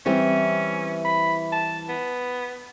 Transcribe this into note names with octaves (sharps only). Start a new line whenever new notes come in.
E3 G3 C4 C#4
B5
A5
B3